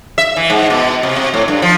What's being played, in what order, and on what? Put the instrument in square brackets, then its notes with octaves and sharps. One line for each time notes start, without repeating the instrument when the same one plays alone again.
[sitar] E5
E3
G#2
B2
C3
C3
A2
G2
F3